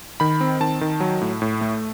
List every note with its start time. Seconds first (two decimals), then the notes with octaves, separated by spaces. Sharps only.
0.20 D#3 B5
0.41 C4
0.60 D#3 A5
0.81 D#3
1.00 F#3
1.22 A2
1.42 A2
1.61 A3